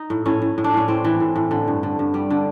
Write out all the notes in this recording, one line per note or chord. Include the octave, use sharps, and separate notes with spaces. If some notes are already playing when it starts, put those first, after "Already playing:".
Already playing: D#4
A2
A2 C#4
A2
A2
D4
A2 C#4
A2 C4
E3
A2
A2
D3
G2
D3
G2
G3
D3